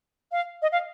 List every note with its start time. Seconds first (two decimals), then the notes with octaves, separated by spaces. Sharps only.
0.32 F5
0.62 D#5
0.72 F5